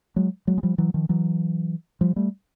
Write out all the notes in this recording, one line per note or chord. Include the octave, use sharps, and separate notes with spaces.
F#3 G#3
F#3 G#3
G#3
F3 G3
E3 F#3
D#3 F3
E3 F#3
F3 G3
G3 A3